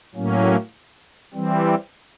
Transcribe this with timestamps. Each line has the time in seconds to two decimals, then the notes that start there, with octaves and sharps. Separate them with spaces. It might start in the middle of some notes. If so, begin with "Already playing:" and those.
0.15 A2 F#3 A#3 C#4
1.34 E3 G3 C4